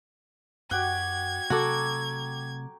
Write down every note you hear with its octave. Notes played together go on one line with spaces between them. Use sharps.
F#2 F#4 G4 F#5 G#6
C3 F#3 A3 F#4 A4 A#5 D6